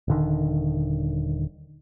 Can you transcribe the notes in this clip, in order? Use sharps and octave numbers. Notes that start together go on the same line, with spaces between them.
D#1 D3 D#3